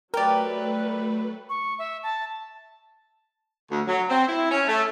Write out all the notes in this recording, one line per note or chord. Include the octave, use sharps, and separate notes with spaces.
F#3 A3 G4 A#4 B4 D5 G5
C#6
E5
A5
D2
F#3
C4
E4
C#4
A3